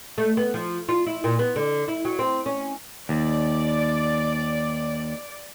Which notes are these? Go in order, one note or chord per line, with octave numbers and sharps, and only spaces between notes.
A3
B3
F3
F4
E4
A#2
B3
D3
E4
F#3
C4
C#4
D#2 D5